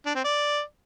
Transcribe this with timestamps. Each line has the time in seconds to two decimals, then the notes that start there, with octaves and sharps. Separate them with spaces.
0.06 D4
0.15 C4
0.25 D5